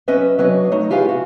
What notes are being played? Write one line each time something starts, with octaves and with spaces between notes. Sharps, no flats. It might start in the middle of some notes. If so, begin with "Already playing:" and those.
F#3 C#4 B4 D#5 E5
F#3 D4 B4 C#5 D#5
A3 D#4
E4 F4 G4 G#4 B4 F5
F#4